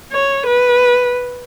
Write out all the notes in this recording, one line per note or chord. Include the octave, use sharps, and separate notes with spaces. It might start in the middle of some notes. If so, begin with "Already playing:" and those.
C#5
B4